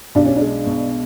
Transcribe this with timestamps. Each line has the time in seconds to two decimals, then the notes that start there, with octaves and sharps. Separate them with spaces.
0.15 B1 D4
0.26 C#4
0.36 G#3 D4
0.66 B2